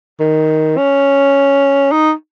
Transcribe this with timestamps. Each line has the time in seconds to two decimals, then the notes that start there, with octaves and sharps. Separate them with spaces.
0.20 D#3
0.78 C#4
1.92 D#4